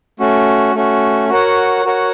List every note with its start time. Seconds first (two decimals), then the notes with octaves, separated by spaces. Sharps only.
0.20 A3 C#4 F#4
0.75 A3 C#4 F#4
1.29 F#4 A#4 C#5 F#5
1.84 F#4 A#4 C#5 F#5